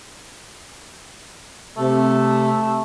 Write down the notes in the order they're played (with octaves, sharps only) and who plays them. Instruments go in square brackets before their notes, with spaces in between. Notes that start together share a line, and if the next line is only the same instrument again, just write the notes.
[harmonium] C3 [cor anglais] A3